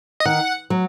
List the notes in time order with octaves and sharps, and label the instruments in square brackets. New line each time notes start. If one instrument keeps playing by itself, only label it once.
[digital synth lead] D#5
[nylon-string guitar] D#3 [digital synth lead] F#5
[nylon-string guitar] F#3